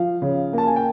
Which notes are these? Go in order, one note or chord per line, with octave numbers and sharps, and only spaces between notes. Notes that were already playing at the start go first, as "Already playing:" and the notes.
Already playing: F3 F5
C#3
A#3 A5
G#5
G5